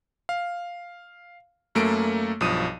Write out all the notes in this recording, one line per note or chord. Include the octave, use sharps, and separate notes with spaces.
F5
F#2 A3 A#3 D7
B1 G2 F3 D#6 D#7